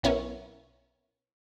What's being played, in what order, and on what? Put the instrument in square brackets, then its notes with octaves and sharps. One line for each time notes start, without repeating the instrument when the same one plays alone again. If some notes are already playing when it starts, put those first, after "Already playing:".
[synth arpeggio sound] B1 B3 C#4 E4 A#4 C#6